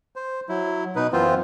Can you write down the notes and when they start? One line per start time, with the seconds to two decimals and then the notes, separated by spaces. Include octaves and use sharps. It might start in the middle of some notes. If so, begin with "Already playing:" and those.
0.16 C5
0.49 F#3 E4
0.96 B2 D#4 B4
1.13 F#2 E3 B3 C4 F4 C5